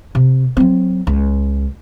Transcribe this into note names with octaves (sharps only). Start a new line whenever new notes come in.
C3
F#3 C4
C#2